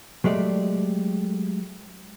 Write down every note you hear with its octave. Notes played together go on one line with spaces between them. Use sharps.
F#3 G#3 A3 G4 D5